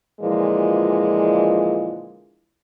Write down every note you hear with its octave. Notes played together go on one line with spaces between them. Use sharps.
A#2 D3 E3 F3 G#3